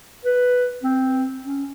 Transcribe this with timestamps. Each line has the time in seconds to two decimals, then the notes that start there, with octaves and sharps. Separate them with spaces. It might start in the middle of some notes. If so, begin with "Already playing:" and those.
0.25 B4
0.83 C4
1.45 C#4